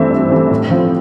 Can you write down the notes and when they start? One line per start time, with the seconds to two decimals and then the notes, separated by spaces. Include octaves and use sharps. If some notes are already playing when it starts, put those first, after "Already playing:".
Already playing: G2 E3 A3 C4 E5
0.10 G2
0.30 E3 A3 C4
0.51 A2
0.70 F3 C4